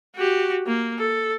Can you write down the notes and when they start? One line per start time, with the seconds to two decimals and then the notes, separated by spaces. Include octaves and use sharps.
0.16 F#4 G4
0.67 A#3
0.98 A4